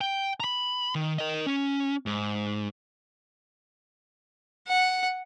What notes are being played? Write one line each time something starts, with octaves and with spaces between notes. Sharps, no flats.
G5
A#5 B5
D#3
A#4 D#5
C#4
G#2
F#5